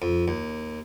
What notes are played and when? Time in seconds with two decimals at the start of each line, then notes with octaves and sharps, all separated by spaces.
0.02 F2
0.28 D#2